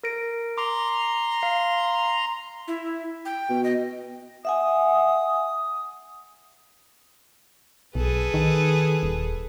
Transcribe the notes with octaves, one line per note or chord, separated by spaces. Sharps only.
A#4 A#6 D7
A#5 C6 D6
F5
E4
G5
B2
D#5
E5 F#5 G#5 D#6
B1 G#4 A4 B4
D#3
D#1